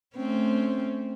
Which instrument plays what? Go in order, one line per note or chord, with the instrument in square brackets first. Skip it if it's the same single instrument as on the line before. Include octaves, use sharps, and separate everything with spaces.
[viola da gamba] A3 C4 C#4